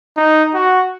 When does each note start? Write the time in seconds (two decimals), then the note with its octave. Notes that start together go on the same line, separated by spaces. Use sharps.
0.17 D#4
0.54 F#4